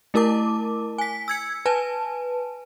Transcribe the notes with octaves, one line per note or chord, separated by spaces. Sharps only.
A3 E4 A#4 A5 D6
G#5 B6
E6 G#6 C#7
B4 G#5 A5